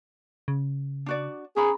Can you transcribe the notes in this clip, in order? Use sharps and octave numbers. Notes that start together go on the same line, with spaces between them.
C#3
D4 F#4 D5
C#4 G#4 A#5 B5